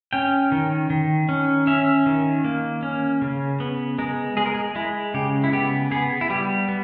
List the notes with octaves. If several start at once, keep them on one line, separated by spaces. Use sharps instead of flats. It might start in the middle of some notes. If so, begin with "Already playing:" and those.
C#4 G5
D#3
D#3
C#4
C#4 E5
D#3
A#3
C#4
C#3
B3
G#3 A#4
G#3 G#4
A#4
G#4
G#3 E4
C#3 G4
E4
B3 G4
B3 G#4
E4
G3 G4
B3